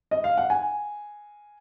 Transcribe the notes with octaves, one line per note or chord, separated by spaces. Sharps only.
D#5
F5
F#5
G#5